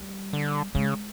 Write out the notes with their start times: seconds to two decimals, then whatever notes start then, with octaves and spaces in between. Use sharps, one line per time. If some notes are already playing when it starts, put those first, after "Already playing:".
Already playing: G3
0.33 D3
0.75 C#3 G#3